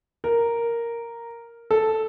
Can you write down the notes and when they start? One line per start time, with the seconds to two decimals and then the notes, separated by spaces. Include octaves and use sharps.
0.24 A#4
1.71 A4